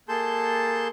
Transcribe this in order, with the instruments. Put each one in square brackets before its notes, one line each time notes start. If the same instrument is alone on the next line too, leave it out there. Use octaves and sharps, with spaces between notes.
[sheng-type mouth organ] A#3 G#4 A4 A5 C6 G6